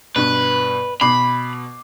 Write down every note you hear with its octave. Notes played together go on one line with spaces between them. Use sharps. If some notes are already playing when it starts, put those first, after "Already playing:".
G2 B2 B4
B2 B5 D6 C7